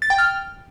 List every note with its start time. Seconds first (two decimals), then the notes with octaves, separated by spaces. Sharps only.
0.02 A6
0.10 G5
0.18 F6